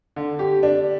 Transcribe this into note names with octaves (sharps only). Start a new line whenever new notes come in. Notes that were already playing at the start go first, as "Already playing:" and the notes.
D3
G4
D4